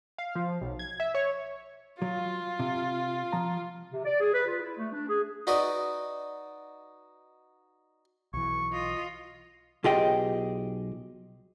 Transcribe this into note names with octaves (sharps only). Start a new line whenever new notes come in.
F5
F3
B1
G#6
E5
C#5
F#3 F4
C3
F3 A#5
C3
D5
G#4
B4
F4
E4
A3
D4
G#4
D#4 F#4 B4 D5 D#5
B1 E3 C#6
F4 D#5
B1 F4 G4 G#4 D#5 G5